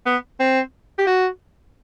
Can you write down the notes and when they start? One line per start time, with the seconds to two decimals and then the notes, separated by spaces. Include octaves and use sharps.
0.06 B3
0.40 C4
0.98 G4
1.07 F#4